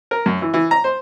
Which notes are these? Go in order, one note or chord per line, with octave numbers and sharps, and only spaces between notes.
A#4
F#2
E3
E3
A#5
C5